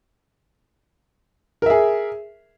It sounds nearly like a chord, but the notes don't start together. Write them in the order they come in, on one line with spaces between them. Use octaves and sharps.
A#4 E5 G#4